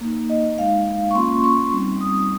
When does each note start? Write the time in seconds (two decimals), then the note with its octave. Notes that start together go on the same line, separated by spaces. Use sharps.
0.01 A#3 D#4
0.30 D#5
0.58 G#3 D#4 F5
1.11 C#6
1.15 A#3 C#4 F4 C6
1.44 C#6
1.72 G3 C4 D#4
2.01 D#6